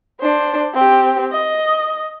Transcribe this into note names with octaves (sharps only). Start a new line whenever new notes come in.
D4 C5
C4 G4
D#5